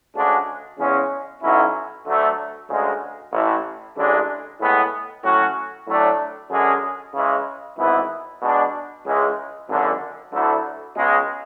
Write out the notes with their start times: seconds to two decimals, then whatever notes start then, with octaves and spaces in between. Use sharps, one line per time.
0.14 D2 C#3 G#3 D4 F#4
0.78 E2 C#3 G#3 C#4
1.41 B1 B2 F#3 C#4 E4
2.06 D2 D3 F#3 A3
2.69 D2 C#3 G#3
3.32 A1 A2 E3
3.96 A1 A2 E3 G#3 D4
4.60 A2 G#3 B3
5.23 A2 F#3 C#4 F#4
5.87 A2 F#3 A3 D4
6.50 F#2 D3 G#3 C#4 G#4
7.14 C#3 E3 G#3
7.78 G#1 G#2 E3 B3 E4
8.42 B2 G#3 D4
9.06 C#2 C#3 E3 G#3
9.69 G#1 F#2 D3
10.33 D2 D3 F#3 A3 E4
10.96 C#2 B2 G#3